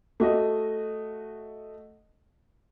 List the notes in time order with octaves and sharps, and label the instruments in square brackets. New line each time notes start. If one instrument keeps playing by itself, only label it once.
[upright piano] A3 F#4 D#5